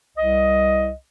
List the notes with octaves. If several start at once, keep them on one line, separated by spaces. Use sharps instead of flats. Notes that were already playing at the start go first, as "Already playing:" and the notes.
C2 D#5